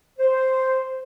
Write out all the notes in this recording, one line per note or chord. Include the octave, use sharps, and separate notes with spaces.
C5